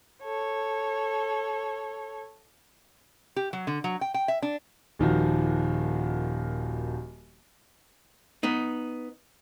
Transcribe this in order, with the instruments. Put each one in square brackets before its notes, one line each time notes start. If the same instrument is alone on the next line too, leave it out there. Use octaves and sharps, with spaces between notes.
[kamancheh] A4 C#5
[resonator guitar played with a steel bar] G4
F#3
D3
F#3
G5
G5
E5
D4
[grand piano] D#1 D#3 F3 F#4
[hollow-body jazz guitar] B3 D#4